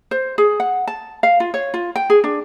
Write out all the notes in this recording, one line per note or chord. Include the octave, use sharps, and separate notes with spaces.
C5
G#4
F#5
A5
F5
F4
C#5
F4
G5
G#4
D4